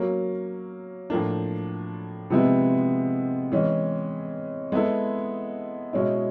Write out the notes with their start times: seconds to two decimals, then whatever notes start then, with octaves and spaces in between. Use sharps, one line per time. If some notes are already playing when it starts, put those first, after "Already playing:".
Already playing: F#3 A#3 C#4
1.10 A2 F3 A#3 D4
2.30 C3 F3 G#3 B3 E4
3.52 E3 G#3 C#4
4.72 G#3 B3 E4 A4
5.93 B2 G#3 C#4 E4